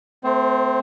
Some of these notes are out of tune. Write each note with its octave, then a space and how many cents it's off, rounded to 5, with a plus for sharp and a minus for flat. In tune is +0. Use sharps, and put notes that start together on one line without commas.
A3 +0 C4 -25 C5 +15